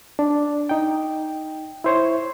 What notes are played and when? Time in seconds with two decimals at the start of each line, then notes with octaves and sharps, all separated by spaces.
0.19 D4
0.69 D#4 G5
1.84 E4 C5 C#5